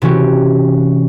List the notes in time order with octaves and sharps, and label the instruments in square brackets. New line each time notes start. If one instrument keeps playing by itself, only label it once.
[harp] C3 E3 C#4 F#4 G4